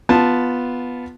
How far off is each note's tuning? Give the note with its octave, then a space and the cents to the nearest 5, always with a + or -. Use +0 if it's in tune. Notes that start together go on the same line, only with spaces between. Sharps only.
B3 +0 F4 +0 A5 +0